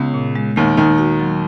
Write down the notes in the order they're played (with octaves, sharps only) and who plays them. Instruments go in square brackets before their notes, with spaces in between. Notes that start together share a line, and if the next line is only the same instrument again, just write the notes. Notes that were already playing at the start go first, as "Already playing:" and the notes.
Already playing: [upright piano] C#2 C#3 [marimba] B3
[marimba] A#2
G#3
[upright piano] D#2 D#3 [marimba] A#3
[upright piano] D#2 D#3 [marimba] D#4
[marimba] F#4
F#3